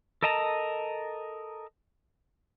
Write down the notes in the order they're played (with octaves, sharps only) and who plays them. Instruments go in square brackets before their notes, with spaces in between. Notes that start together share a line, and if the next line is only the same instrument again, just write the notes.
[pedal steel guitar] A4 A#4 D#5 A5 A#5